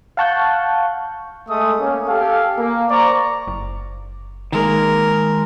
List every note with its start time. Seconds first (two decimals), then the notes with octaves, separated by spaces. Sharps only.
0.17 F5 F#5 A5 C#6 F#6 G6
1.48 G#3 A3 D#6
1.79 A3 A#3 C#4
2.08 G4 A4 F5 G#5
2.58 A#3
2.90 C5 D5 A#5 C#6
3.47 F#1
4.52 D#3 G#3 A#3 A#4